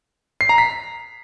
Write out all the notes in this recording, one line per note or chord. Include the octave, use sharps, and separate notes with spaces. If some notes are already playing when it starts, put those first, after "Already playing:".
C7
A#5
B6